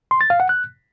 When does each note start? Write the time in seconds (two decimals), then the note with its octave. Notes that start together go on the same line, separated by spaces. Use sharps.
0.11 C6
0.21 A6
0.30 F5
0.40 F#5
0.49 F#6